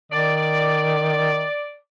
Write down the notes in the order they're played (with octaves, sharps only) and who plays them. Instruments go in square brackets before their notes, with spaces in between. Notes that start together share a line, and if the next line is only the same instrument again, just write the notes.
[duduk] D#3 [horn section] D5